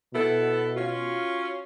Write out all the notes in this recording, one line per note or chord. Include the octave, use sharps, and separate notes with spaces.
B2 B3 E4 A4
C#4 F4 F#4 F5